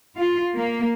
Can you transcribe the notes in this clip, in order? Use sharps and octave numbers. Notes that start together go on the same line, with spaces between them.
F4
A#3